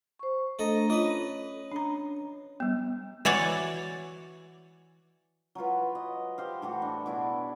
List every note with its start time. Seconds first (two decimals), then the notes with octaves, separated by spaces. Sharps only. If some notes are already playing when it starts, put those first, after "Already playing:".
0.19 C5 C#6
0.59 A3 D4 A4 D#5 A#5
0.90 C#4 F4 B4 C#5 D#5
1.72 D4 A#5
2.60 G3 B3
3.25 E3 F#4 C#5 D5
5.55 F#3 E4 F4 B4
5.95 D#5
6.38 G4 C5 F5
6.62 A2 E3 F#4 A4
6.82 D4
7.06 B2 E4 G#4 D5